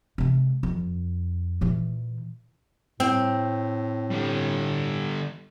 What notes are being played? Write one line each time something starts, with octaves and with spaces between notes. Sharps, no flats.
C3 G#3
F2
A#2 E3
A2 C4
D3 G3